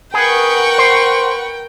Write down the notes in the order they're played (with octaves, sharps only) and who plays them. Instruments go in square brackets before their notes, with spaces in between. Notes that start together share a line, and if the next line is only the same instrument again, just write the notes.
[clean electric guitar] G#4 [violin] A#4 G5 [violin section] B4 F#5 C#6
[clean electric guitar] C5